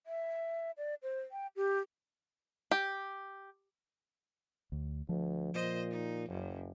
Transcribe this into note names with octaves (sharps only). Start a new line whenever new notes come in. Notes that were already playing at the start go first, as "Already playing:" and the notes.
E5
D5
C5
G5
G4
G4
D2
D2 F3
A#2 C5 D#5
D#4
F#1 F#2